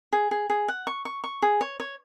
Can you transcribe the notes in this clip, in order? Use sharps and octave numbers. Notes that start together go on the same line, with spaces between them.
G#4
G#4
G#4
F#5
C#6
C#6
C#6
G#4
C#5
C#5